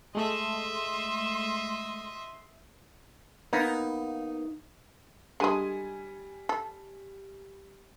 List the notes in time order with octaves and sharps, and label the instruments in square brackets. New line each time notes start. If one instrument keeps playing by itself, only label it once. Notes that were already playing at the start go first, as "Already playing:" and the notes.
[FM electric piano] G#3 A3 [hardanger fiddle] D#5 E5 [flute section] C6
[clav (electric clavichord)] A#3 B3 [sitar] D#4
[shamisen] D3 G#3 [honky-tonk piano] G3 G#5 D#7
[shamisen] A4